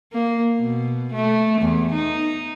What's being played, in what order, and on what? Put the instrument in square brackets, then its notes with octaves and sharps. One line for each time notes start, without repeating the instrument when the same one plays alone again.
[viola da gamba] A#3
B2
A3
E2
D#4